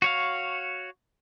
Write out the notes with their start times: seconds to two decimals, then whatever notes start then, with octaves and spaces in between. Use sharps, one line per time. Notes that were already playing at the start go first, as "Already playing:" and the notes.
0.02 F#4 C#5 F5